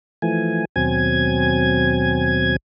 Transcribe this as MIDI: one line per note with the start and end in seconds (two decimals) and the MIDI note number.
0.22 0.65 52
0.22 0.65 53
0.22 0.65 57
0.22 0.65 80
0.76 2.56 39
0.76 2.56 47
0.76 2.56 54
0.76 2.56 60
0.76 2.56 80
0.76 2.56 92